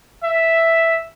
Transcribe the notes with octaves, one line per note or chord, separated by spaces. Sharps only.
E5